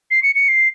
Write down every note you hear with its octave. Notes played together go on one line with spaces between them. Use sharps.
C7
C#7
C#7
C7